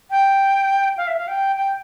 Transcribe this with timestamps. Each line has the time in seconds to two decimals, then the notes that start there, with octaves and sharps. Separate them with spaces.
0.11 G5
0.98 F5
1.07 E5
1.17 F5
1.28 G5
1.56 G5